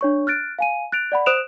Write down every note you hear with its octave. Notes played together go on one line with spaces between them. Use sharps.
D4 C#5 C#6
F6 F#6 A6 D7
F5 G#5 D#7
F#6 A6 D7 F7
D5 F#5 B5
C5 D#6 F#6 D7 E7 F7